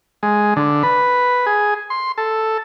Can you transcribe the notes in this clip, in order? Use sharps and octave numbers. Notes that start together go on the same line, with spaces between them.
G#3
D3
B4
G#4
C6
A4